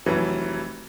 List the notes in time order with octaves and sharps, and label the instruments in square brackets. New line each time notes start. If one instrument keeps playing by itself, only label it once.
[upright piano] F1 E3 F#3